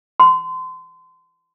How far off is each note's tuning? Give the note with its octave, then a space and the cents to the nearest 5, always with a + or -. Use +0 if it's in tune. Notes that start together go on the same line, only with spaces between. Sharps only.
C6 -30